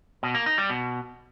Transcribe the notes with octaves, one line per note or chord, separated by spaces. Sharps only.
B2
A#3
D#4
G3
B2